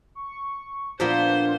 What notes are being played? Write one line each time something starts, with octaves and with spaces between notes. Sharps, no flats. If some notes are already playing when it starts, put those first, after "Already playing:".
C#6
A#2 F3 A#3 B3 D4 C5 C6